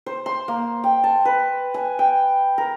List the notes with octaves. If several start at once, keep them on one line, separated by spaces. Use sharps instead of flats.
C5
C6
A#3
G5
A5
B4
G#5
G5
A#4